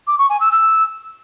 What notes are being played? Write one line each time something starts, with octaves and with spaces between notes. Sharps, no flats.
D6
C#6
G#5
E6
E6